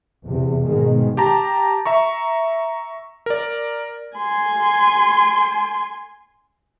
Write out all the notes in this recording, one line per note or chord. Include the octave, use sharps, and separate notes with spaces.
E2 C3
G#2 B2 D#3 G#3
G4 A5 A#5
E5 A#5 C#6
A#4 D5
G#5 C6